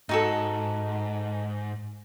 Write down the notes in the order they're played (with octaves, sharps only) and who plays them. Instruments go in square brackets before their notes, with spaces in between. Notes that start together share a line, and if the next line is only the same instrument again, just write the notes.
[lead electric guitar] G#2 [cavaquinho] D#4 F#4 A4